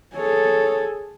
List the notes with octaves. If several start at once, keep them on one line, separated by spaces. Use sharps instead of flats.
G#4 A4 C#5